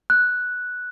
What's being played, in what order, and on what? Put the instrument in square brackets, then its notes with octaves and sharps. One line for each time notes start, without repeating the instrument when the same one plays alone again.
[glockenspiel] F#6